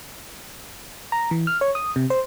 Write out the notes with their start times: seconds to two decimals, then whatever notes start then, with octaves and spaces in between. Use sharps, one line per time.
1.12 A#5
1.31 E3
1.47 F6
1.61 C#5
1.75 D#6
1.96 C3
2.10 C5